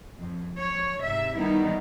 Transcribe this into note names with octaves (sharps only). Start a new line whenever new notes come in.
F2
F3 C#5
G#2 C3 E5
D#3 G3 G#3 B3 D#4 E4